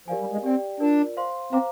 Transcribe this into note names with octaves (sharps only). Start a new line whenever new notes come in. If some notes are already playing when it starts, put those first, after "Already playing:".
F3 G4 A#4 D5 F5 G#5
G3
G#3
C4 G4 D5 G5
D4 F4 A#4 D5
C5 F5 C6
C4 C5 F5 A#5 D6